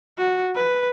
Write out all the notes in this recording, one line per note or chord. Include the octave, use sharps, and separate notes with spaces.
F#4
B4